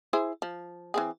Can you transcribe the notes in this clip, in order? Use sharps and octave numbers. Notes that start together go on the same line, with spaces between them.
E4 G#4 C5
F3
E3 C4 G#4